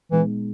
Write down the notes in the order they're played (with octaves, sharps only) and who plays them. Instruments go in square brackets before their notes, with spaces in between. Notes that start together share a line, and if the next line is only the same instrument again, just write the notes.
[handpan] A#2 G#3 B3 D#4 [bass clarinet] E3